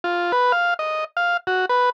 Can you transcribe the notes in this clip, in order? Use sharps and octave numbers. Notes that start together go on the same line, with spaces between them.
F4
B4
F5
D#5
F5
F#4
B4